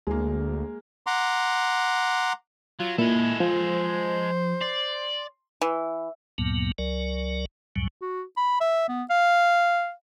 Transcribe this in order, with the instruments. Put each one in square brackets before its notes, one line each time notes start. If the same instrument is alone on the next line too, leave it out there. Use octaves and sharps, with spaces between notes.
[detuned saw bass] D2 [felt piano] G#3 A#3
[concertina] F#5 A#5 C6 D6
[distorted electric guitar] F#3 [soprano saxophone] F4
[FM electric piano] A#2 [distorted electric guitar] G#3 A4 [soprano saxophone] E4
[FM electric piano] F3 [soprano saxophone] C5
[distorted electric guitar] D5 [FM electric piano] C6
[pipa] E3
[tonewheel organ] D2 G2 A#2 F#3 A#3 B3
C#2 F#3 A#4 D5
C#2 F#2 A2 F#3 G3
[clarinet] F#4
B5
E5
B3
F5